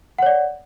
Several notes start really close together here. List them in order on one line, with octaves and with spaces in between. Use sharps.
F#5 C#5 D5